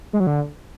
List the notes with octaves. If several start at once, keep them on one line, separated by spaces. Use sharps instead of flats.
G#3
F#3
D3